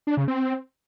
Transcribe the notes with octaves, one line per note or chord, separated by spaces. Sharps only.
D4
C#3
C4